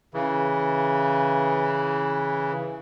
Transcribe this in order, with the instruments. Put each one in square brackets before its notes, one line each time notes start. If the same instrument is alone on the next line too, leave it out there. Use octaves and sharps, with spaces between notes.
[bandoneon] C#3 E3